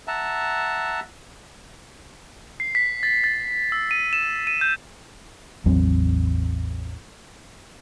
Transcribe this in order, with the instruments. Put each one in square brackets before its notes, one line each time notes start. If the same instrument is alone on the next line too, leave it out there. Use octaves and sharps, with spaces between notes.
[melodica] E5 F#5 A5 A#5
[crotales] C7
B6
A6
A6
E6
D#7
E7
D#7
G6
[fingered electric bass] A1 E2 F#3 C4